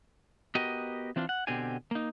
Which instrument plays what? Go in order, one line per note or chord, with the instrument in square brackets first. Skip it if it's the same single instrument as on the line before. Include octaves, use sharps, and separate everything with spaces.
[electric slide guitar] B3 F#4 G4 A#4 D#5
E3 C4 D4 F4
F#5
B2 D3 C4 G4 G#5
A#3 D#4